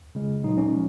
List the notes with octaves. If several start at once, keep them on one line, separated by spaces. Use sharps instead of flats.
C#3 G#3
A#2 F#3 D#4
C#4
F3 G#3